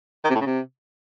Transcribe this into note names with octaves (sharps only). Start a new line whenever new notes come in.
D#3
C3
A2
C#3
C3